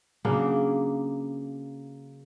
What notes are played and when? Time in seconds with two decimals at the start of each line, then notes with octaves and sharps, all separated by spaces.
0.25 C#3 F#3 A#3 D4